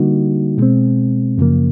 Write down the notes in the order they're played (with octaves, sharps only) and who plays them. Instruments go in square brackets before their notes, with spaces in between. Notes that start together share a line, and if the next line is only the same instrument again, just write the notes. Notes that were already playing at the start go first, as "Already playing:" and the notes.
Already playing: [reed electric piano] D3 G3 A#3 D#4 F#4
B2 G#3 C4
F#2 C#3 F3 A#3